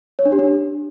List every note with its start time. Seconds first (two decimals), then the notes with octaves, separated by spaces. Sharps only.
0.19 C#5
0.25 D4
0.32 G4
0.39 D4